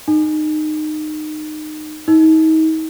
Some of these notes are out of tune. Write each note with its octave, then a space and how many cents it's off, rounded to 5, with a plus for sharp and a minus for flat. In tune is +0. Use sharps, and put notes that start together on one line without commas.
D#4 -20
D#4 +35